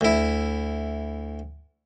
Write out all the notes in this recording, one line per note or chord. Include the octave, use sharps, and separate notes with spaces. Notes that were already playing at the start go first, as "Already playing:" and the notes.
D2 E4